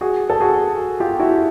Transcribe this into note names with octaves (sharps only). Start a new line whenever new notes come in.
F#4 G#4
A4
F#4 G#4
F4 G4
E4 F#4